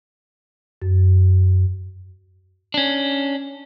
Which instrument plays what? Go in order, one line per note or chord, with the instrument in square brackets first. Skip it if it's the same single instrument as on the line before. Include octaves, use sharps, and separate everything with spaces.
[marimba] F#2
[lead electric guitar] C#4 D4